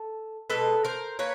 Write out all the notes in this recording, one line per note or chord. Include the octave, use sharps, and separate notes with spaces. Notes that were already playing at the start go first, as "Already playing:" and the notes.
Already playing: A4
B2 G#3 A4 B4
A#4 C5
A#3 B4 C#5